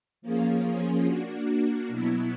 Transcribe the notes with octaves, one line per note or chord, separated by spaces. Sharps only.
F3 A#3 C#4 F4 G#4
A#3 D4 F#4
B2 F#3 B3 E4